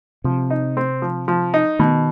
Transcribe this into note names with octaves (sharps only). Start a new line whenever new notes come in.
C3 F3
D#4
C4
F3
F3
D#4
B2 D#3